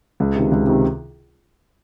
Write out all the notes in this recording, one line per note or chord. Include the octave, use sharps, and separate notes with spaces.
C#2
C3 D#3
C#2
C3 D#3